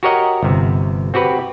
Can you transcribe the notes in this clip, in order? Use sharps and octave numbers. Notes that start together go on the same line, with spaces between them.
F#4 G4 A#4 C#5 D#5 F#5
G1 C3
C4 F#4 G4 B4